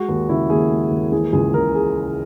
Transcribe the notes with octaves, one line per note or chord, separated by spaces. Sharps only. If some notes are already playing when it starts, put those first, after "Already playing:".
Already playing: G#3 F#4
D#2
C#3 E4
D#2 G#4
G#3
D#2
E3 G#4
C#2 G#4
C#3 A#4
G#4